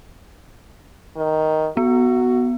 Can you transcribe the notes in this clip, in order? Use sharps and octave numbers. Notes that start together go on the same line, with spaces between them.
D#3
B3 F#4